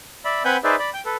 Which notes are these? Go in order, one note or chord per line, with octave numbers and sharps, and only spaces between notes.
D5 E5 B5
C4 B4 F#5 G#5 B5 G6
D#4 G#4 B4 C5 D5 E5
D5 B5
G5 G6
A4 B4